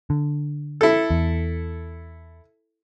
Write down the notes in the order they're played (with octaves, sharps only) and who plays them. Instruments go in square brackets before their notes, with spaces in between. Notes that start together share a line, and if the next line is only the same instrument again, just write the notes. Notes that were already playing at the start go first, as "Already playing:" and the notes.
[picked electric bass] D3
[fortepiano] E4 A4
[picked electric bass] E2